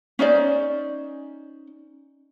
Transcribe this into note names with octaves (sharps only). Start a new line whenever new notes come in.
C#4 D#4 C5 D5